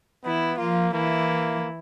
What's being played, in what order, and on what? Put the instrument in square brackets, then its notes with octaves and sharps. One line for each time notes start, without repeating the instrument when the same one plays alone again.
[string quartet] E3 E4 [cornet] B3
[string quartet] F3 F4 [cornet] A#3
[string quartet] E3 E4 [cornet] A#3